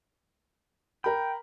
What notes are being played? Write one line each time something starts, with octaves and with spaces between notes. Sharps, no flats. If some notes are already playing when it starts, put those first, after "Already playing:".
A#4 G5 B5